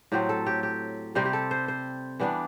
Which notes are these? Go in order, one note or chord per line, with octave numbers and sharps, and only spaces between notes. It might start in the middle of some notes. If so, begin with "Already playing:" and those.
A2 F#3 C4 G4
A4
G4
G4
C3 G3 C4 G4
G4
A4
C5
C5
E3 G3 B3 D4